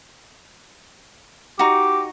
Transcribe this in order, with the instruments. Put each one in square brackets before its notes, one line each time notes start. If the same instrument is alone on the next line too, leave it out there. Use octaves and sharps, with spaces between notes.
[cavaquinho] D#4 F#4 [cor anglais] G4